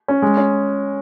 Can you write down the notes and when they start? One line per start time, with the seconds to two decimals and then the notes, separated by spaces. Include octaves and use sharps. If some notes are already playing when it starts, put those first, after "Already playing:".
0.08 C#4
0.22 G#3
0.37 C#4